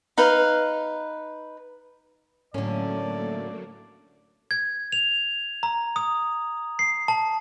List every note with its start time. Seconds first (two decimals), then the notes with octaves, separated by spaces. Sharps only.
0.18 D#4 B4 F5
2.54 A2 D3 F#3 A3 A#3 C#4 D5
4.51 G#6
4.92 F7
5.63 A#5
5.96 D#6
6.79 C7
7.08 A5